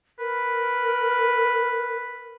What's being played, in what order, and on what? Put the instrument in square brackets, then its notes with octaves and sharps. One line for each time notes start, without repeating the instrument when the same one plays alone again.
[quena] A#4 [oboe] B4